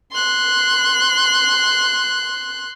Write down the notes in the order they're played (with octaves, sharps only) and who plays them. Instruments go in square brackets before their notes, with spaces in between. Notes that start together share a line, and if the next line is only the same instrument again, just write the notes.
[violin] C6 F#6